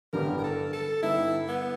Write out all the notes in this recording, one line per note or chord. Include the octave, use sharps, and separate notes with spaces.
A1 G2 D3 G3 B3 A#4
A#4
A4
A4
G2 D3 G3 B3 D#4 E4
B3